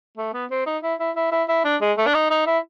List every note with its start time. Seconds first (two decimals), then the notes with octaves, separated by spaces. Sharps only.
0.17 A3
0.34 B3
0.51 C4
0.66 D#4
0.83 E4
1.00 E4
1.16 E4
1.32 E4
1.49 E4
1.65 D4
1.81 G#3
1.98 A3
2.07 D4
2.14 D#4
2.30 D#4
2.47 E4